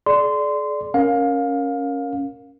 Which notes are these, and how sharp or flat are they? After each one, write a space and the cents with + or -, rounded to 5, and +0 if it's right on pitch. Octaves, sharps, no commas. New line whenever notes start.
G#4 +45 D5 +0 C6 -20
C#4 +0 A#4 +0 F5 +20